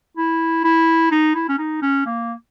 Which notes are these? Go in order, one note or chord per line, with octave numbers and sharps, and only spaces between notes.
E4
E4
D#4
E4
C#4
D#4
C#4
A#3